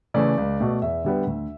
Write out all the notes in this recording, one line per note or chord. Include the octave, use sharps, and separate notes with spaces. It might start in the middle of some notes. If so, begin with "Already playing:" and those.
C#3 E3 A3 D5
C#2
B2 A3
E2 E5
D3 G3 B3
D2